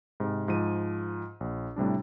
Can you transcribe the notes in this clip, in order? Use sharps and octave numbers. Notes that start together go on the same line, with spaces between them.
G#2 C3
G#2 F3 D#7
A#1
A2 C3 G3 D4